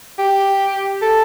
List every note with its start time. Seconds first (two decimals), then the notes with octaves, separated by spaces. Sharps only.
0.19 G4
1.02 A4